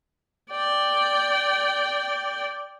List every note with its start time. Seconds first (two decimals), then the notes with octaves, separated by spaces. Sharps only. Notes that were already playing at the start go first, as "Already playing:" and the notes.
0.51 D5 G5